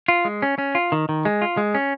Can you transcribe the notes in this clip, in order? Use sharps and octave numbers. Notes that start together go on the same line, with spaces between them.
F4
G#3
C#4
C#4
F4
D#3
D#3
G#3
F4
G#3
C#4